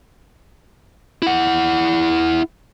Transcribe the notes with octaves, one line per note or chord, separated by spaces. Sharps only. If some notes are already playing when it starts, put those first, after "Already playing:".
E4 F#5